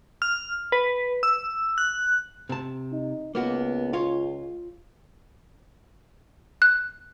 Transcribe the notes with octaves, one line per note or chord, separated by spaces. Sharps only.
F6
B4
E6
F#6
C3 A5
D#4
C#2 A#3 B3 F#4
F4 C#5
F#6